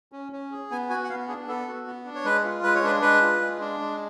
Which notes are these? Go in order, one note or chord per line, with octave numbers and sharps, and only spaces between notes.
C#4
C#4
G#4
B3 G#5
F#4 G#5
F#5
B3 F5
D4 G#4
B3 A4
F#4
B3
D4
C#5
G#3 B4
F4
G#3 B4
C#5
D4 B4
G#3 B4
F4
G#3
D4
G#3